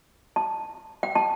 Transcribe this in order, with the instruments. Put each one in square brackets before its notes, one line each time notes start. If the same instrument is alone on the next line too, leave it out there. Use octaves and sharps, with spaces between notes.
[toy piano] A5
G5
A5